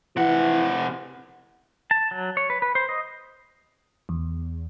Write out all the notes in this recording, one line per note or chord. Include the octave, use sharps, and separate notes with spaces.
C3 E3 F#5
A5
F#3
C#5
B4
B4
C5
D#5
E2